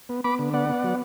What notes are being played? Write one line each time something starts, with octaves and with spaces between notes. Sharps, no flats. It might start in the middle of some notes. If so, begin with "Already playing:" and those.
B3
B3 B5 D6
D3
B3 D5 F#5
B3
F#3